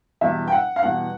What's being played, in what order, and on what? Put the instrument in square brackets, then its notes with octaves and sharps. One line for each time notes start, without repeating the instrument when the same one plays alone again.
[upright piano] E2 B2 G3 E5
G5
F#5
F5
E2 B2 G3 F#5